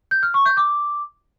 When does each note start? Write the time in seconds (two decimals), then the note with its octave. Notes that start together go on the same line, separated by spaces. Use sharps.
0.11 G6
0.23 F6
0.34 C#6
0.46 G6
0.57 D6